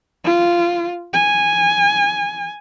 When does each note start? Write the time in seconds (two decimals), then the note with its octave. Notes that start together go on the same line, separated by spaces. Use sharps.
0.24 F4
1.13 G#5